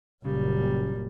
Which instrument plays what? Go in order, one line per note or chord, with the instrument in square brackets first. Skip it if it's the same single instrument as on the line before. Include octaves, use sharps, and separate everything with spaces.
[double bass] F#1 A#2 [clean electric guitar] C#3 [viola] G3